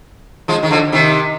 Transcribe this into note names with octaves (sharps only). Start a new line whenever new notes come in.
F3 G#3
D#3
D3 F3
C3 D#3